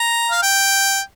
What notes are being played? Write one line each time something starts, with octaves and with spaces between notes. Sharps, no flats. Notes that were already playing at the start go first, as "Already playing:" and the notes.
Already playing: A#5
F5
G5